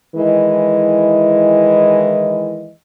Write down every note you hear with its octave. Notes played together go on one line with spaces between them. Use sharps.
D#3 E3 G#3 E4 D#5